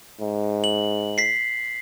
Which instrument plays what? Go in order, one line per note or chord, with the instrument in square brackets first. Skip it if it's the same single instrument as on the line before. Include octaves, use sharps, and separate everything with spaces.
[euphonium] G#2
[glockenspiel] F#7
B6 C7